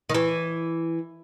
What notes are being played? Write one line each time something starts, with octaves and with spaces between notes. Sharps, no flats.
D#3
E3